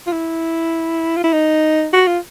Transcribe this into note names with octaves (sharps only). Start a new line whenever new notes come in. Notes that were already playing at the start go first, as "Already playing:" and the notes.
F4
E4
F4
E4
D#4
F#4
F4